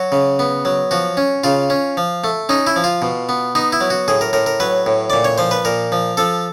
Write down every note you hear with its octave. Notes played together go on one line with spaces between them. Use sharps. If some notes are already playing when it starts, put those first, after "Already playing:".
Already playing: F#3 F#4
C#3
B3
F#3
F3 F#4
C#4
C#3 F4
C#4
F3
A3
C#4 D#4
E4
F3
F4
B2
B3
B3 D#4
E4
F#3
F#4
A2 G#4
A#4
A2 A#4
A#4
F#3 B4
A2
A#2 D5
C#5
F3 C5
B4
A#2 A#4
F3
F3 A4